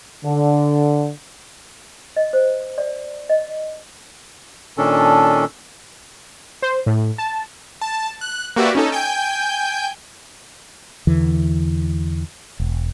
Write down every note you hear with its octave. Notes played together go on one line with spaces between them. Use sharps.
D3
D#5
C5
D5
D#5
A#2 D#3 C#4 D4 A4
C5
A2
A5
A5
F#6
A#3 F#4 G4 B4 D5 E5
C#4 D#4 A4
G5 G#5 G6
E2 D3 E3
E1